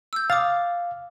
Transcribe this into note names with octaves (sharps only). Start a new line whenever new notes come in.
E6 G6
F5 D6 D#6 A6